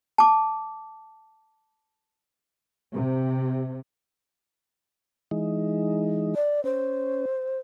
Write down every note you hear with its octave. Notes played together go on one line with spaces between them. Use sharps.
A5 D6
C3
E3 G#3 D#4
D5
C#4 C5